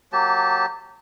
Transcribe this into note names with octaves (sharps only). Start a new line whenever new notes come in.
F#3 A#3 G4 A5